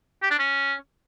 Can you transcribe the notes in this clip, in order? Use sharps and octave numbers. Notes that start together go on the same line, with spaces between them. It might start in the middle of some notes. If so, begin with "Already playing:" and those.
G4
D4
C#4